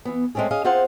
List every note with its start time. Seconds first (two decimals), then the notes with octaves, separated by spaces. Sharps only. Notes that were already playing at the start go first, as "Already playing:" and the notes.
0.05 E3 B3
0.35 G#3 A3 C4 C#4 G#4
0.51 C#4 G#4 D#5 F5
0.64 C4 F4 G#4 C5 F5 F#5